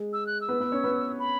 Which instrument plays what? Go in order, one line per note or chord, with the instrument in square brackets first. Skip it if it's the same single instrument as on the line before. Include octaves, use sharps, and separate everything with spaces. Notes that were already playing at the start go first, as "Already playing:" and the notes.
Already playing: [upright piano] G#3 G#4
[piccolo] E6
F#6
E6
[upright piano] B3 B4
B3 B4
C#4 C#5
B3 B4
[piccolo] B5